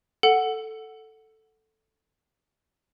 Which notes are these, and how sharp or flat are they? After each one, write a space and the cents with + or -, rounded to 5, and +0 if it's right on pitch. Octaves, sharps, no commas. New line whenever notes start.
A4 +0 F#5 +0